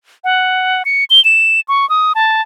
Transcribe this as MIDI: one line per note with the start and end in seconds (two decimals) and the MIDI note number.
0.24 0.83 78
0.85 1.04 97
1.10 1.23 103
1.25 1.60 100
1.68 1.88 85
1.90 2.13 87
2.15 2.42 81